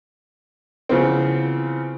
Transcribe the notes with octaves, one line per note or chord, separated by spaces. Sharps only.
C#3 E3 F3 B3 C4